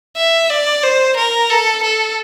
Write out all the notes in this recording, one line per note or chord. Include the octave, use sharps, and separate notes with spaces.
E5
D5
C5
A#4
A4
A4